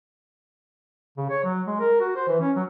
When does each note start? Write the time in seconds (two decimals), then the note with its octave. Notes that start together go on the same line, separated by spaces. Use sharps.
1.17 C#3
1.30 C#5
1.44 F#3
1.67 G#3
1.80 A#4
2.01 F#4
2.16 C5
2.28 E3
2.41 C#4
2.56 F#3